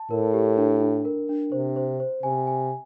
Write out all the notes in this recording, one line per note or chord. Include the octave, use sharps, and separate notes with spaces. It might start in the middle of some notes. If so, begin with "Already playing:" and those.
Already playing: A5
A2 A#4
G4
D4
D4
A#4
D4
C3 C5
C5
C5
C3 G#5
G#5